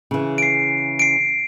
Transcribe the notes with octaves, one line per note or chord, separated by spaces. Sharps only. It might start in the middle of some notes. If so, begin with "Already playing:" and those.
C#3 E3
C7 D7
C7 D7